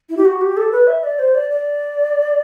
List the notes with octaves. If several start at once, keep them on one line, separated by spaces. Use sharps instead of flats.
E4
G4
F#4
G4
A4
B4
E5
D5
C5
D5
D5